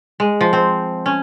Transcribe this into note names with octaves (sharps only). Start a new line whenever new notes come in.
G#3
F3
C4
C#4